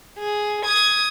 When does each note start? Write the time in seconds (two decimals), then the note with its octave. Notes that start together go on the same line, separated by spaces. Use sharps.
0.19 G#4
0.65 D#6 G#6